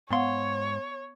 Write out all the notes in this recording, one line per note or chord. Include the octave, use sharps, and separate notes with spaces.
G#2 B3 C#5 F5 F#5 C6